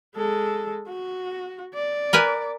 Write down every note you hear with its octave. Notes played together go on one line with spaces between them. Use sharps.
G#3 A4
F#4
D5
A#4 B4 G#5